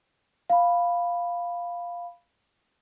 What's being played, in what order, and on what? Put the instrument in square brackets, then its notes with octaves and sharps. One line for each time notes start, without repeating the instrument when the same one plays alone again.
[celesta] F5 B5